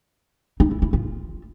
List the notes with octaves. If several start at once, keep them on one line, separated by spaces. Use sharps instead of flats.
D#4
E4
E4
F4